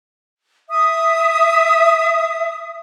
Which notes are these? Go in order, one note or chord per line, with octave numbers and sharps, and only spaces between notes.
E5 D#6